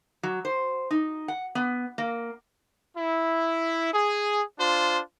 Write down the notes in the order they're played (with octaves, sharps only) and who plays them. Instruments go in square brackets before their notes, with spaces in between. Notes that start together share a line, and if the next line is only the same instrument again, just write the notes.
[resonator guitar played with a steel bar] F#3
C5
D#4
F#5
B3
A#3
[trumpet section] E4
G#4
D4 F4 C5